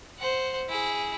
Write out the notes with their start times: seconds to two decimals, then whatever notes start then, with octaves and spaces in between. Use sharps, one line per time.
0.19 C5 F#5
0.69 E4 G#4